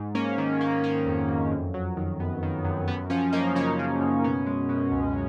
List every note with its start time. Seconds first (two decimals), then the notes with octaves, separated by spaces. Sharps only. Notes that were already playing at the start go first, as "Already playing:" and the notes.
Already playing: G#2
0.15 A#3 C#4
0.38 D#3
0.61 A#3
0.84 A#3 C#4
1.06 F2
1.28 F2
1.52 F#2
1.74 F#3
1.97 D#3
2.19 F#2 B3
2.43 D#3
2.64 F#2
2.88 F#2 B3
3.10 F3 C#4
3.33 A#3 D#4
3.55 C#3 C#4
3.79 C#3
4.01 F#2
4.24 B2 C#4
4.46 G#3
4.69 B2
4.92 C#2